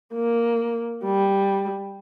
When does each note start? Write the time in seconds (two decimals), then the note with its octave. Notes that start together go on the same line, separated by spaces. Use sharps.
0.13 A#3
1.04 G3